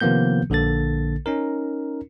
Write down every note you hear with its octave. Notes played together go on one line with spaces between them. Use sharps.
C3 D#3 F3 A#3 B3 G6
A#1 D3 A#3 A4 A6
C#4 D#4 A#4